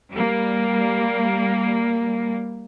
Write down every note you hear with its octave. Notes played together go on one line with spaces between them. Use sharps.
G3 A#3